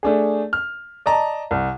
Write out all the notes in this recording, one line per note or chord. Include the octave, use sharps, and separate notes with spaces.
A3 D4 G#4
F6
D5 D#5 A5 A#5
C2